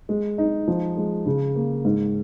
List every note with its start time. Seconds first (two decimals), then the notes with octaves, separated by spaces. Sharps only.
0.09 G#3
0.38 D#4
0.68 F3
0.97 G#3
1.26 C#3
1.55 A#3
1.85 G#2